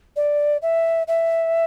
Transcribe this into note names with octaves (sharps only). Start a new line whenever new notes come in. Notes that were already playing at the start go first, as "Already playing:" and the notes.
D5
E5
E5